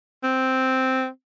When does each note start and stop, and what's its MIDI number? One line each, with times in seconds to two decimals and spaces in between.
0.24 1.08 60